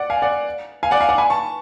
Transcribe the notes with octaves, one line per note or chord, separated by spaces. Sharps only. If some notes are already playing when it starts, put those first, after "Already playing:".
Already playing: D5 F#5
F5 G#5
D5 F#5
F5 G#5
D5 F#5
F5 G#5
D5 F#5
G#5 B5
A5 C#6